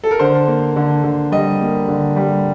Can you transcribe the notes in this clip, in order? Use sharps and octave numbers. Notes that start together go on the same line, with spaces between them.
A4
A#4
D3 C5
A#3
D3
D3
G3 D#5
A#3
D3
G3